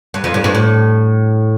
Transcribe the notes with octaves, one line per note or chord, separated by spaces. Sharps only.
G2
F2
G2
G2
A2